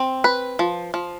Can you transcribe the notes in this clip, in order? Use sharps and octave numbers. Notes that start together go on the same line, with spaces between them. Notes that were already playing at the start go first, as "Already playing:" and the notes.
Already playing: C4
B4
F3
F3